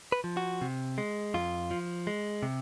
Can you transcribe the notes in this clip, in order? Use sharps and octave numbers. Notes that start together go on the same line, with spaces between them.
B4
F3
F#4
C3
G#3
F2 F4
F3
G#3
C3